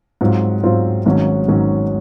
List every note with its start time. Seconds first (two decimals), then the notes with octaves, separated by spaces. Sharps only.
0.21 G#2 F#3 C4 F4
0.63 G#2 F#3 C4 F4
1.06 G#1 G#2 D#3 F#3 C#4
1.48 G#1 G#2 D#3 F#3 C#4